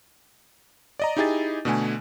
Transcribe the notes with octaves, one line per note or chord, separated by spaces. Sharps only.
D5 D#5 A#5
D#4 E4 G4 G#4 D#5 A6
B2 D3 A3 G#5